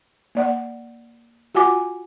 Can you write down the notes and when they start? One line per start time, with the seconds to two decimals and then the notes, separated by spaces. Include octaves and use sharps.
0.35 A#3 D5 F#5
1.55 F4 F#4 F#5 G#5 D6